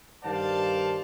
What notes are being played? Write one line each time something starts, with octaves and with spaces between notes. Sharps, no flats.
G2 D#3 C5 D5 F5 A5